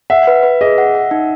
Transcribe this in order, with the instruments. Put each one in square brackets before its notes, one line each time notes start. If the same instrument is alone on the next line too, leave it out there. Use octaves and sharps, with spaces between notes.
[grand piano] E5 [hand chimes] F#5
[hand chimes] B4
B4
[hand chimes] G#4 [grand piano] D#5
[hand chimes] F#5
F#5
D#4